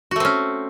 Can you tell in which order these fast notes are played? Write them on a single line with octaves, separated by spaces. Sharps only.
F#4 A3 C4 C#4